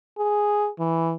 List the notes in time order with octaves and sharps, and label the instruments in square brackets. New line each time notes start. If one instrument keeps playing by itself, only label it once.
[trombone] G#4
E3